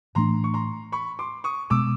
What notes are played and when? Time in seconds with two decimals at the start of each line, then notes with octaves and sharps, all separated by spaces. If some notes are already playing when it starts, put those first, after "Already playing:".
0.15 A2 E3 A3 D4 A#5 C6
0.44 C#6
0.54 A#5 C6
0.92 B5 C#6
1.19 C6 D6
1.44 C#6 D#6
1.70 B2 G#3 B3 D6 E6